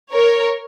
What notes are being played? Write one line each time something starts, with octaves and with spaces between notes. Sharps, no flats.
A#4 C#5